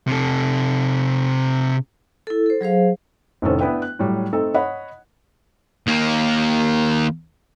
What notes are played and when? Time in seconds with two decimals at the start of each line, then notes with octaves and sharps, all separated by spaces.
0.07 C3 A4
2.27 E4 A4
2.46 A4 C5
2.61 F#3 G#4 C5 F5
3.42 F1 A2 D#3 C#4 A4 C5
3.61 B3 D4 E4 B4 G5
3.82 F#6
3.99 A2 F#3 G3
4.33 A3 C4 D#4 A4
4.54 C#5 D#5 F#5 B5
5.87 D#2 A#3